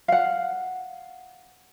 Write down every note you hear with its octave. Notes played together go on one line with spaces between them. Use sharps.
F5 F#5